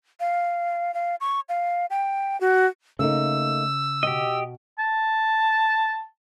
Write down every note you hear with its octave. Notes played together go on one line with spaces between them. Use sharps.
F5
F5
C#6
F5
G5
F#4
C#3 A3 A#3 D#4 E6
B2 G4 D#5 G5
A5